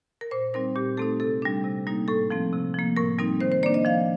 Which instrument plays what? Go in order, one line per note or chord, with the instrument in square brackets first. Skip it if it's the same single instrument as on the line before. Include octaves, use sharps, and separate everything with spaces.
[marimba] A#4
A#2 C5
G3 C4 D#4 A#4
A#2 G4
A3 C4 D#4 A4
C3 A4
G3 D4
C3
G3 A#3 D#4
A2 A4
F3 A3 C4
C3
F3 A#3
A2 A#4
G3 C4 D#4 A#4
D#3 C5
C5
A#3 D4 D5
D#5
F3 F5